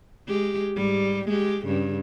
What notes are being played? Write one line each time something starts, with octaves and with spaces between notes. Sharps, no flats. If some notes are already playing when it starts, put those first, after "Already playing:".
G#3 G4
G#2 G3
G#3 G4
G2 C#3